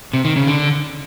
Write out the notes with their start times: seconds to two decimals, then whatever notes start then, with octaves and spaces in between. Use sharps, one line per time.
0.13 C3
0.25 D#3
0.36 C#3
0.47 D3